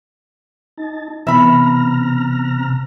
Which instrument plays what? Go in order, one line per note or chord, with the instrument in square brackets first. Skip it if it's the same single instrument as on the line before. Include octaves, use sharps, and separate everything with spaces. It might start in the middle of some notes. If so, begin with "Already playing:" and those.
[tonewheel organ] D#4 A5
[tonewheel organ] C3 A#5 F6 [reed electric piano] E3 B3 [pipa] E5 B5